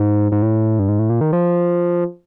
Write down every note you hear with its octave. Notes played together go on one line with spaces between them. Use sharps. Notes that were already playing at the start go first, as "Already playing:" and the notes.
Already playing: G#2
G#2
A2
G2
G#2
A2
A#2
D#3
F3